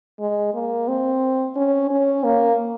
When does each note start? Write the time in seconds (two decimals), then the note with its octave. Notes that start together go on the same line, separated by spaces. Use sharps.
0.19 G#3
0.54 A#3
0.88 C4
1.56 C#4
1.91 C#4
2.24 A#3